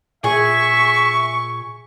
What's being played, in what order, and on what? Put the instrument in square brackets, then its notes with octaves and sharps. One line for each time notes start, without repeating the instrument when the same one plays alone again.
[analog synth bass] A#2 [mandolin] G#4 G#5 [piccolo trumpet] E5 [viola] C#6